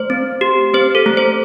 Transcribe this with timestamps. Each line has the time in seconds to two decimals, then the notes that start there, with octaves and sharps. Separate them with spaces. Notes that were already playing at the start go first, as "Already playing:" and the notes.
Already playing: A3 C5
0.10 C4
0.41 G4
0.74 C4 C5
0.95 A4
1.06 A3
1.17 C5